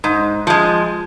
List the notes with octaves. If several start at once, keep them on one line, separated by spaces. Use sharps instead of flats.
G#2
F3 G#3